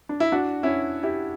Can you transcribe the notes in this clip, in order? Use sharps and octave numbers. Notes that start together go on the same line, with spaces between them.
D4
E4
D4 F#4
C#4 E4
E4 G4